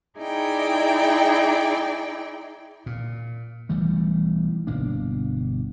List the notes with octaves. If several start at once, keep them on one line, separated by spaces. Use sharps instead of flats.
D#4 E4 G#4 D5 G5
A#2
B1 E3 G3 A3
G1 B2 A#3 D4